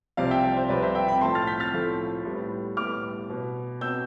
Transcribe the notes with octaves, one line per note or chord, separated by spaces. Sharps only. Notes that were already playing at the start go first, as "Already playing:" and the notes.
C2 C3 F3 C4 D5 F5
E5 G5
D5 F5
C5
C2 C3 F3 C4 B4 D5
C5 E5
E5 G5
G5 B5
A2 F3 A3 A5 C6
F6 A6
G6 B6
F6 A6
A2 F3 A3
A2 G3 B3
A2 G3 B3 D6 F6
B2 B3
B2 B3 E6 G6